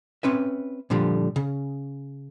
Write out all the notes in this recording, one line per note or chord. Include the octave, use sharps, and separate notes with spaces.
C4 C#4 B4 E5
A#2 D3 F3 G3
C#3